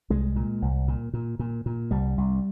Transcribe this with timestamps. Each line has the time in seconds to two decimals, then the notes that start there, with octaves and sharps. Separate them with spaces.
0.10 C2 G#3
0.36 A#2
0.62 C2
0.88 A#2
1.13 A#2
1.39 A#2
1.66 A#2
1.91 C2 G3
2.18 C2